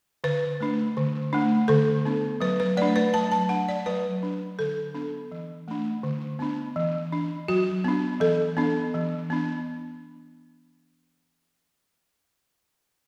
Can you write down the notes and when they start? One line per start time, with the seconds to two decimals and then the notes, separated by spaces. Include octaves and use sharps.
0.24 D3 B4
0.61 A3 D4
0.97 D3
1.33 A3 D4
1.68 D3 A4
2.05 B3 D4
2.40 F#3 B4
2.60 B4
2.77 A3 D4 D5
2.96 B4
3.14 F#3 A5
3.32 A5
3.49 D4 F#5
3.68 D5
3.86 F#3 B4
4.23 D4
4.59 D3 A4
4.94 B3 D4
5.32 E3
5.68 A3 D4
6.03 D3
6.39 B3 D4
6.76 E3
7.12 D4
7.48 F#3 F#4
7.84 B3 D4
8.20 E3 A4
8.57 B3 D4
8.94 E3
9.30 B3 D4